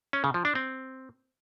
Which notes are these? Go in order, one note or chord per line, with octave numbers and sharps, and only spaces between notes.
C#4
C#3
F3
D4
C4